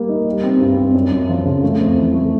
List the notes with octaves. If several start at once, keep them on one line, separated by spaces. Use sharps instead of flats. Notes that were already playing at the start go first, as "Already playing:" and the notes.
Already playing: G3 A#3
D#4
G3
C4
G2
C4
F#2
F#2
F3
C#3
A3
F2
E3
A3